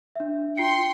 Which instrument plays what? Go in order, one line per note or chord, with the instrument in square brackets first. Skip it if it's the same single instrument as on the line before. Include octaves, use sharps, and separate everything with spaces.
[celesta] D4 E5
[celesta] F4 C7 C#7 [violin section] G5 C6